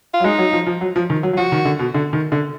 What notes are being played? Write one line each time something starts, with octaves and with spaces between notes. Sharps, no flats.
F4
F#3
G#3 D#4
F#3
F3
F3
F#3
F3
D#3
F#3
F#3
F3 F#4
D#3
D3
B2
D3
D#3
D3